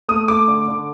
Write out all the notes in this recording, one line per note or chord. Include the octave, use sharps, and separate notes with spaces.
A3 D#6
A3 D6
D3
D3